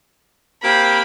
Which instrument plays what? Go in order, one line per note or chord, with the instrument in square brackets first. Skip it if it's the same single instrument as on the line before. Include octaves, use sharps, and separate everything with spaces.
[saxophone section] A#3 C4 G4 [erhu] B5